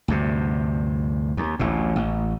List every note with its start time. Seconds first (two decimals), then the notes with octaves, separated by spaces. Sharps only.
0.08 D2 G2 C3
1.37 D#2
1.59 A1 D2 A2
1.96 A1